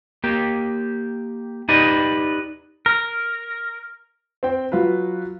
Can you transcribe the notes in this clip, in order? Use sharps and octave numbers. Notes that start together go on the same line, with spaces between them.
A#3 G4
D#4 G4 B4 D5 D#5
A#4
C4 G5
F#3 F4 F#4 B4